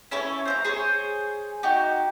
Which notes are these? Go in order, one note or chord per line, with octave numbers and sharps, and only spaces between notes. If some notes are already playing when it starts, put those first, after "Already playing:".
C#4 E4 A4 C#5
C5 E5 A#5
G#4 C5 C#5
D#4 F#4 G4